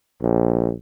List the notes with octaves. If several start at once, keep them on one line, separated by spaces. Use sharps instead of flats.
A#1